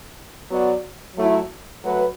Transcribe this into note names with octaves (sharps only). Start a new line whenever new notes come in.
F#3 B3 F#4 D5
F#3 A3 E4
F#3 A3 F#4 B4